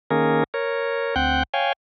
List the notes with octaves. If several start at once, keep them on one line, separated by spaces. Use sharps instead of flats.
D#3 A#3 C#4 G#4 A#4
A#4 C#5
D2 C4 F#5 G5 F#6 G6
C#5 F5 G5 G#5